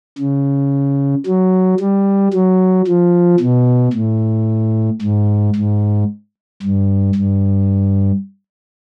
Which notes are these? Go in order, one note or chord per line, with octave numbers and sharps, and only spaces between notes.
C#3
F#3
G3
F#3
F3
B2
A2
G#2
G#2
G2
G2